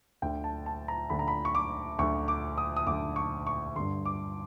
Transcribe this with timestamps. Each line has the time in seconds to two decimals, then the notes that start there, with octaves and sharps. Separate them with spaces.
0.22 D2 D3 G5
0.44 A5
0.66 A5
0.88 A#5
1.09 D2 D3 B5
1.19 A#5
1.28 B5
1.45 C#6
1.55 D6
1.99 D2 D3 C#6
2.28 D6
2.58 D#6
2.77 D#6
2.87 D2 D3 D6
3.16 C#6
3.47 C#6
3.76 G2 D3 C6
4.05 D6